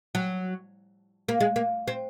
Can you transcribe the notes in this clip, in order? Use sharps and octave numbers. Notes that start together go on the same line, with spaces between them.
F#3
A#3
G#3
A#3
C4